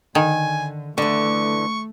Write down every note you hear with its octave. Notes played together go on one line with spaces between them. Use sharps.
D3 D#3 G#5
D3 E3 A3 C#6